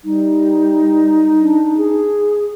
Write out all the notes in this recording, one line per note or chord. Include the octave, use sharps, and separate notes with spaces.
G3 D#4
D4
G#4